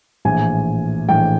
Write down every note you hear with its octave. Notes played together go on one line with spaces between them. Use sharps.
A#1 A2 E3 G#5
A#1 A2 E3 G5